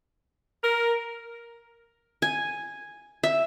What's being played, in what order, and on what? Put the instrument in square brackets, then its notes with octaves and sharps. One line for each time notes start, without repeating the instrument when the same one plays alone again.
[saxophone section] A#4
[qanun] G#5
E5